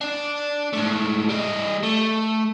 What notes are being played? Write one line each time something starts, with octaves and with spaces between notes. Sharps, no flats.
D4 D5
G#2 A3
G3 D#5
A3